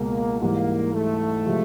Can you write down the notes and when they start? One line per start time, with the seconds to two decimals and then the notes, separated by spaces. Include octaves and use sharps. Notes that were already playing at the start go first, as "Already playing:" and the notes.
Already playing: C#2 B2 G#3 A#3
0.41 G#2 E3 G3 A#3
0.93 A3
1.46 C3 F3 G#3